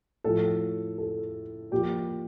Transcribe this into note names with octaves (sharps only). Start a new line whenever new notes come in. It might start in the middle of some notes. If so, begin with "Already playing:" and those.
A2 F3 A4
A4
A#2 F3 G4